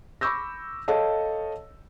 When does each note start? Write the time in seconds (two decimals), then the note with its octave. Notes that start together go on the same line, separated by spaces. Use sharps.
0.21 B5 C#6 D6 E6 G6 A#6
0.88 A4 C#5 D#5 F5 A5